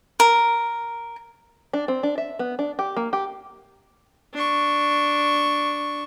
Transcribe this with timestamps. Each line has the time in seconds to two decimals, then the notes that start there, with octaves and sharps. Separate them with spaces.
0.20 A#4
1.73 D4
1.88 C4
2.03 D4
2.18 E5
2.39 B3
2.59 D4
2.79 G4
2.97 A#3
3.13 G4
4.34 D4 C#6